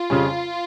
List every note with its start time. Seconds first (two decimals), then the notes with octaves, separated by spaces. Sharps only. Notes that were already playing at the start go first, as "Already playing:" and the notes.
Already playing: F4
0.10 F2 C#3 G3 C#4